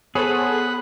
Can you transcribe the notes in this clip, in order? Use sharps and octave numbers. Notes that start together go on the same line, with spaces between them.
B3 G#4 A4 C5 C#5 F#5 B5